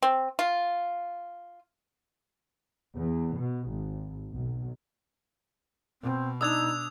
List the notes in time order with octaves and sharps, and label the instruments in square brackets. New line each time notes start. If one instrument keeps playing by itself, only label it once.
[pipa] C4
F4
[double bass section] E2
B2
G#1
B1
[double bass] B2 [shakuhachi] C4
[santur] D4 E6 [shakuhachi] D#4 [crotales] D#6 G#6 F7